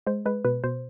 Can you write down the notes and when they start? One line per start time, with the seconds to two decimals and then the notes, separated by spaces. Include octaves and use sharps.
0.07 G#3 C5
0.26 G#3 B4
0.45 B2 B4
0.64 B2 C5